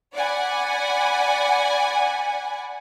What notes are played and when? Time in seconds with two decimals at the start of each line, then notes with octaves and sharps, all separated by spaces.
0.14 D5 F#5 G#5 B5